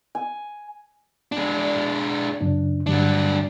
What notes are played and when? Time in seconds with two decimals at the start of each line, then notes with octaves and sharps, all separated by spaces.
0.15 G#5
1.32 G#3 D4
1.59 D5
2.41 F#2 C#3 D4
2.87 G2 D3 F#3 G3 D4